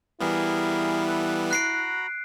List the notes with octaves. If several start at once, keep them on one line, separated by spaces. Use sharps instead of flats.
E3 G3 B3 E4 G#4 A#4
A4 B4
F#4 A#5 B5 F#6 C7 D7